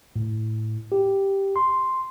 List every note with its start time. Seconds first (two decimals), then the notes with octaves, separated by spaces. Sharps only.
0.16 A2
0.92 G4
1.56 C6